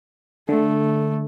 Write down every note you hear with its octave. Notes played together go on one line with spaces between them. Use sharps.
D3 A3